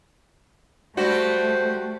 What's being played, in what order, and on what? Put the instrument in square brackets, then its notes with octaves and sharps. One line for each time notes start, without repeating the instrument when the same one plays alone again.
[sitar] G3 F#4 [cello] A3 [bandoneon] C5